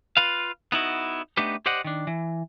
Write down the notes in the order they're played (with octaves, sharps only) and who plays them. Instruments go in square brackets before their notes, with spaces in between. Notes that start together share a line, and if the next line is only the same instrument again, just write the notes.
[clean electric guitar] F4 B4 F5
B3 D#4 E4 F#4
A3 B3 D4 D#4 G4 B4
G4 C5 D5 D#5 F#5
D#3 D4
E3